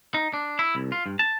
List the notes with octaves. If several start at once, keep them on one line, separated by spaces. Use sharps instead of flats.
D#4
D4
E4
C2
F4
G2
A5